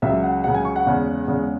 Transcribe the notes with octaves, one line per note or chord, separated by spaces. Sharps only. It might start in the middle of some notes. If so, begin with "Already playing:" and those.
C#2 C#3 F#3 E5
F#5
C#2 C#3 F#3 F#5
G#5
C#6
F#5
E2 C#3 G#3
E2 C#3 G#3